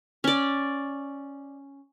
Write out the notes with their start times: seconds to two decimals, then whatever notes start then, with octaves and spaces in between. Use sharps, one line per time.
0.24 C#4 D5